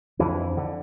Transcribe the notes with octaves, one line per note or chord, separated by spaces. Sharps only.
F2 D3 E3
D3